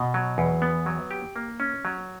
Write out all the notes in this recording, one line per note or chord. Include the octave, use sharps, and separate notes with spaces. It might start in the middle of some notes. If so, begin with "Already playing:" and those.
Already playing: B2
F#3
E2
B3
F#3
G4
A#3
C#4
F#3